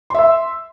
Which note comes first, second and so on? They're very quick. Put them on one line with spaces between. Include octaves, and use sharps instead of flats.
C6 E5 E6